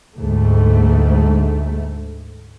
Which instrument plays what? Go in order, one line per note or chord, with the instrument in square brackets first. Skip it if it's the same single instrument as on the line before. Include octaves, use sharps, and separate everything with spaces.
[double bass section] D2 G#2 A3